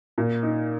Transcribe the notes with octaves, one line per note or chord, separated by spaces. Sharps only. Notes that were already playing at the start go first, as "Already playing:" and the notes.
A#2
D#4